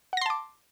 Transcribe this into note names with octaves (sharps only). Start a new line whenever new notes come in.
F#5 A5 C6 D6 A#6